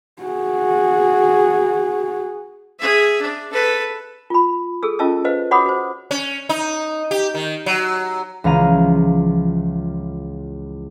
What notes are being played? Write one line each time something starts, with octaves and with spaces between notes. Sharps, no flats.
F#4 G#4
G#4 E5
D4
A4 B4
F4 B5
G#4 A4 E6
C#4 F4 D#5 A5 E6
B4 C5 D#5 F5
F#4 C#5 F#5 B5 D6 D#6
F#4 C5
C#4
D#4
G4
D#3
F#3
C#2 E3 F3 F5 A#5 D#7